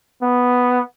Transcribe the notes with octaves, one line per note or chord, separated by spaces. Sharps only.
B3